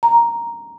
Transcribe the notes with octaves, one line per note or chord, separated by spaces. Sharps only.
A#5